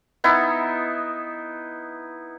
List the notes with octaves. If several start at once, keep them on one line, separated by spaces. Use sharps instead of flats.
B3 D#4 E4